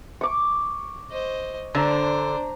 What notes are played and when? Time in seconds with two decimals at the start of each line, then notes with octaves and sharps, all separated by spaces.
0.21 C#6 D6
1.11 C5 D#5
1.75 D3 D4 C5 A#5